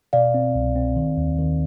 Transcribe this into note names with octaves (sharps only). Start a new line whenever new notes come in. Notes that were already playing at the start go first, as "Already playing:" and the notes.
B2 D5 F5
C4
C2
C4
D#3
D#2
D#3